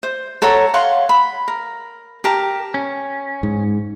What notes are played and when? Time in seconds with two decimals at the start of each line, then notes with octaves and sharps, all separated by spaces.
0.03 C5
0.42 A4 C#5 F#5 A#5
0.74 C#5 F5 F#5 C6
1.09 B5
1.48 A#4
2.24 G4 A#4 A5
2.74 C#4
3.43 G#2